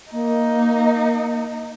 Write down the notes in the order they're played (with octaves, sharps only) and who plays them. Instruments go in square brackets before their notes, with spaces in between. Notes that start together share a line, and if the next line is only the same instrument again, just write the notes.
[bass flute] A#3 [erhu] D#4